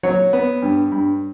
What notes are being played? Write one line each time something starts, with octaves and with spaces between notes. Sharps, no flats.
F#3 C#5
B3
G2
G2